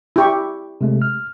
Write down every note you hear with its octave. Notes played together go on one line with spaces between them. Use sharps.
E4 G4 C#6
C3 G#3 A3
F6